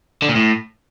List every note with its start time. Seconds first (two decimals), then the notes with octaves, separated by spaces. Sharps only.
0.22 D3
0.29 A#2
0.35 A2